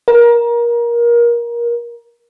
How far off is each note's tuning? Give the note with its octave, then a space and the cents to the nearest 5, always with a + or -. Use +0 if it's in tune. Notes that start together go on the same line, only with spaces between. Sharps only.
A#4 +25